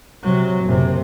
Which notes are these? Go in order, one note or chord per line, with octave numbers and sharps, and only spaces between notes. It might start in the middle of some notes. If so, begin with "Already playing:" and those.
C3 F#3
F#1 C3